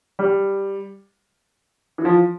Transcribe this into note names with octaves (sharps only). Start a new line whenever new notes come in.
G3
E3
F3